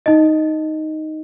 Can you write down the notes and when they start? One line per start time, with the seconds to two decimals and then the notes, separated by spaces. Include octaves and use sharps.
0.06 D#4 D#5